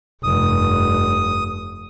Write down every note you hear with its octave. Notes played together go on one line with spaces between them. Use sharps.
F1 G2 D#6